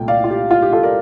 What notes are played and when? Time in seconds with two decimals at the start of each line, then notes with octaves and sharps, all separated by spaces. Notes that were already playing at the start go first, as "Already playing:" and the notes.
Already playing: C2 A#2 A3 G5
0.08 D5 F5
0.24 F4
0.30 G4
0.51 F4
0.62 G4
0.73 F4 A4
0.83 A#4 D5